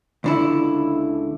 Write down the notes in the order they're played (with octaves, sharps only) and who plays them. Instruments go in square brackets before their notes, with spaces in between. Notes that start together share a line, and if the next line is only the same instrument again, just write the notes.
[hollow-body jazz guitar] C#2 D3 E4